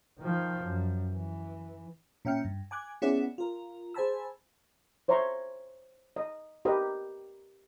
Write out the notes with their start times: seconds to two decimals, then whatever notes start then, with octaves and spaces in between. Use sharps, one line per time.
0.19 D#3 F3
0.63 F#2
1.11 E3
2.25 A#2 C#4 E5 G5 F6 C#7
2.44 G2
2.71 G#5 D6 F#6 G#6
3.02 B3 C#4 E4 G#4 D5 F#5
3.38 F4 A#4
3.94 G#4 C5 G#5 A5 B5 E6
5.08 C5 C#5 E5 A#5 C6 C#6
6.16 D#5
6.65 G4 A#4 B4 D#5